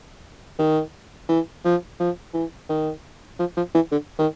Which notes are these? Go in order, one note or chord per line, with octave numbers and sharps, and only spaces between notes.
D#3
E3
F3
F3
E3
D#3
F3
F3
E3
D3
D#3